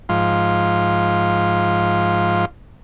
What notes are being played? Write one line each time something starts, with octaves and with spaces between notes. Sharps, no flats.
G#2 F3 F4